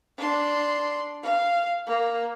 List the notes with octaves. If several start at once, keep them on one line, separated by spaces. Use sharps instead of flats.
D4 C6
F5
A#3